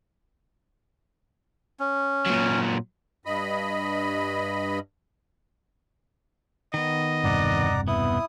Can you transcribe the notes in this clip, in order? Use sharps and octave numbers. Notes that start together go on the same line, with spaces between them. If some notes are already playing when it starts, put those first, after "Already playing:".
C#4
A#2 F#3
G2 D#5 B5
D#3 B3 D#5
E1 G2 C3 D5 F#5 A#5
B3 E4 D#6